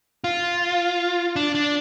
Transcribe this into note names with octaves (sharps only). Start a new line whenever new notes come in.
F4
D4
D4